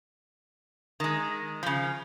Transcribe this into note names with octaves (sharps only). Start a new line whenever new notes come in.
D#3 G#3
C#3 F3